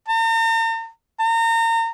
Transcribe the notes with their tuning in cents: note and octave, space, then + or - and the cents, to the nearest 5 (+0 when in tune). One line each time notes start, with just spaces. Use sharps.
A#5 -45
A#5 -35